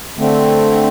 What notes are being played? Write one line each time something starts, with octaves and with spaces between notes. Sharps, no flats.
D3 A3 C4